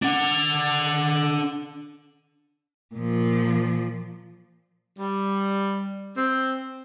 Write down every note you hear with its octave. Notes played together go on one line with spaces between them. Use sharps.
D4 F#5
A#2 F3
G3
C4